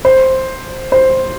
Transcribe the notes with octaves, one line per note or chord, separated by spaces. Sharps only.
C5
C5